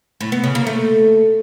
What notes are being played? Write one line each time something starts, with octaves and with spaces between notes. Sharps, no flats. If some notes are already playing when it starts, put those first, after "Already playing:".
A2
B3
C#3
A#3
A3